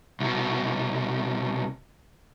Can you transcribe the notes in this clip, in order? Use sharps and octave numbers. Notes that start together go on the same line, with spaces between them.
C2 B2